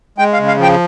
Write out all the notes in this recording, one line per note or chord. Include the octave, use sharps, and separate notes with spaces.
G#3 G5
F5
C#3
F5
F3
G5